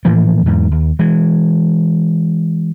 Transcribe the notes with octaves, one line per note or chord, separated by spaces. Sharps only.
A2 E3 F3 A#3
E2 G#2
D#2
E3 G#3